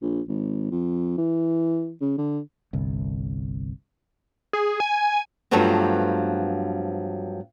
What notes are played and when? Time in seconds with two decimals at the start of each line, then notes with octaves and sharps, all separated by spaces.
0.02 A#1
0.28 G#1
0.71 F2
1.18 E3
2.01 C#3
2.18 D3
2.73 G1 C2
4.53 G#4
4.80 G#5
5.51 G2 F3 F#3 A3 B3 C4